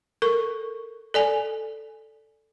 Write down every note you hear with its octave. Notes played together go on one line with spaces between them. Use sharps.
A4 A#4 C#6
A4 D5 G#5